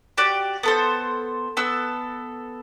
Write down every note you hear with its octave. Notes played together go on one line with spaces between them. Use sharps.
F#4 G4 D5
B3 A4 C5
B3 A4 E6